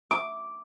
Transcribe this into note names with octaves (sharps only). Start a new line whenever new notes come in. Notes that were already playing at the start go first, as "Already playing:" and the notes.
D6